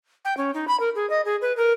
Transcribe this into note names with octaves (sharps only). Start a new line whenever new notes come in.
G5
C#4
D#4
B5
A#4
G#4
D#5
G#4
B4
A#4